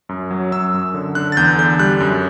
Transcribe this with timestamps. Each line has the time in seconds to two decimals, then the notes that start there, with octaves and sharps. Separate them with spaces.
0.09 F#2
0.31 F#3
0.52 F#2 E6
0.74 F#2
0.94 D3
1.15 D3 F#6
1.32 A6
1.37 E2 G6
1.58 D3 G6
1.79 G3 F#6
2.00 F#2